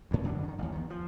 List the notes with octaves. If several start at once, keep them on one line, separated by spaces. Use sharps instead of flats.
D2 G#2
F#2 D3 B3 D4
D3 D#3
A1 D#2
E2 D#3
F3